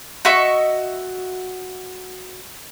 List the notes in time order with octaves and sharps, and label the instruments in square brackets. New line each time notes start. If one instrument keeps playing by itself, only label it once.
[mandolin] F#4 D#5 E5 C#6